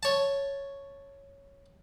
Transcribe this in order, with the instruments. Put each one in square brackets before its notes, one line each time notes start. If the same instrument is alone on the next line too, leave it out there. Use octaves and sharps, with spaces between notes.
[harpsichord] C#5 A5